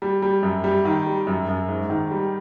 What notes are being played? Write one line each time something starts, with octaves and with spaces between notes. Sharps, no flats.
G3
G3
F#2
G3
D#3
G3
F#2
F#2
G#2
D#3
G3